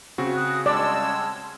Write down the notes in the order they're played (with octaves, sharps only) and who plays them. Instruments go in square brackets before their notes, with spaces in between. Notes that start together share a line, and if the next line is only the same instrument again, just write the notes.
[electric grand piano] C#3 C4 F#4
[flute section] D#6 F#6
[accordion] G3 G#3 E6 [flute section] C#5 A5 C6 [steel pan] D5